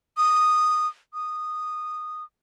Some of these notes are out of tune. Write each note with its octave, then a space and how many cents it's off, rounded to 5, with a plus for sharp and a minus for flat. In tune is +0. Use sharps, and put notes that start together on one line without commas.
D#6 -10
D#6 -10